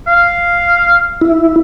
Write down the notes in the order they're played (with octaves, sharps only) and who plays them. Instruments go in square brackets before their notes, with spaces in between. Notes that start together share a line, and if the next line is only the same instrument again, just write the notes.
[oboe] F5
[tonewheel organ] E4